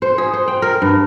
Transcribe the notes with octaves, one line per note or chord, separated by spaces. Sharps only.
C5
G#4
C5
G5
A#4
G2